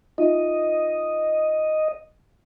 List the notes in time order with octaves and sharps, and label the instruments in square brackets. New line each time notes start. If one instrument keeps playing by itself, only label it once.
[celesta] D#4 F4 E5 [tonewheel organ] D#5